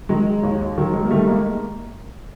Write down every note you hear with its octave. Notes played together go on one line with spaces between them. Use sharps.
D#3 F#3 G#3
D#2
D#3 F#3
F#3 G#3
A#3
D#3 G3 A3
G#3 A#3